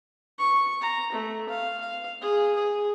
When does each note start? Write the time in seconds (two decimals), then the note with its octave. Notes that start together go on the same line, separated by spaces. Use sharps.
0.39 C#6
0.81 A#5
1.12 A3
1.49 F5
1.80 F5
2.22 G#4
2.55 G#4